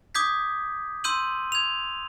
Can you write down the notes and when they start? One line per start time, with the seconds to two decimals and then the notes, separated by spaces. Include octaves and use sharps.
0.15 D6 D#6 G6 G#6 B6
1.04 C6 E6 G6 D#7 F#7
1.52 G#6 F7